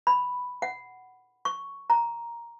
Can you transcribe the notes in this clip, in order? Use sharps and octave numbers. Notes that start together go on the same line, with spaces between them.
B5
F#5
C#6
A#5